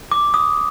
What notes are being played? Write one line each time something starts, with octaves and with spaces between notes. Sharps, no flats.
D6
D#6